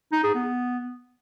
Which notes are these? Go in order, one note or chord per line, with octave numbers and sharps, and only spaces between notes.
D#4
G#4
B3